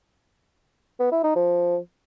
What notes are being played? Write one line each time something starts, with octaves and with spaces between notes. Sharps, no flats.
B3
E4
D#4
F3